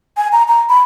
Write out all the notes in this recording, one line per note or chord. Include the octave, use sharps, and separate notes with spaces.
G#5
A#5
A#5
B5